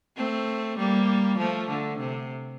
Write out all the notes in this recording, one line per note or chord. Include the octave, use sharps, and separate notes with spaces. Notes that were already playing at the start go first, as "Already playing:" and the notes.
A3 C4
G3 A#3
F3 A3
D3
C3